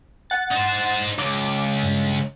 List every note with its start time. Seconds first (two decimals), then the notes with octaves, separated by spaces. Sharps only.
0.30 F#5 A6
0.51 D#4 C5
1.19 C#2 D6
1.83 G2